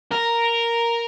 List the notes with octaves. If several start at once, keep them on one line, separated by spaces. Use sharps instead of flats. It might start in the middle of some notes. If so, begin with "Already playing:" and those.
A#4